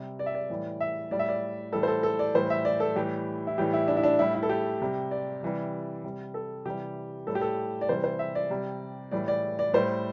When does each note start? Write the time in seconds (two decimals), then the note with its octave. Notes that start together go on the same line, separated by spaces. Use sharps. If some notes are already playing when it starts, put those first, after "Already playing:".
Already playing: C3 G3
0.19 D5
0.26 E5
0.34 D5
0.50 A2 E3 G3
0.80 E5
1.11 A2 G3 D5
1.19 E5
1.29 D5
1.72 A2 E3 G3 A4
1.83 C5
1.88 A4
2.03 A4
2.19 D5
2.34 A2 E3 G3 C5
2.50 E5
2.65 D5
2.80 A4
2.95 A2 E3 G3 G4
3.47 E4
3.58 A2 E3 G3 G4
3.73 E4
3.88 D4
3.97 E4
4.03 D4
4.19 A2 G3 E4
4.35 E4
4.43 A4
4.49 G4
4.81 C3 G3
5.11 D5
5.43 C3 E3 G3
6.04 C3 G3
6.34 A4
6.65 C3 E3 G3 G4
7.27 A2 G3 A4
7.35 G4
7.41 A4
7.81 D5
7.89 C3 E3 G3 C5
8.04 C5
8.19 E5
8.35 D5
8.50 C3 G3
9.11 A2 E3 G3 D5
9.28 D5
9.59 D5
9.73 A2 G3 C5